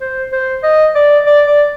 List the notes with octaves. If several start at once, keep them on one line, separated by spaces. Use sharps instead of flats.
C5
C5
D#5
D5
D5
D5